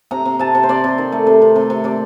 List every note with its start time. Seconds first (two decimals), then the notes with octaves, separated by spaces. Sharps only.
0.11 C3 A#5
0.25 C3
0.39 C3 A5
0.55 C3
0.63 C5
0.69 C3 D5
0.84 C3
0.98 D#3
1.12 A3
1.27 C3
1.42 C3
1.56 C3
1.70 C3
1.84 C3 D5